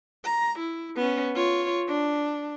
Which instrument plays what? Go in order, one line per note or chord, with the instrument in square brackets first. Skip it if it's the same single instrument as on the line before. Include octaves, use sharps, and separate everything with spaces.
[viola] A#5
E4
B3 C#4
F4 C#5
D4